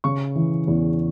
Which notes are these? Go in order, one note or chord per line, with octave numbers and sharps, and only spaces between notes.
C#3 C#6
E3
E2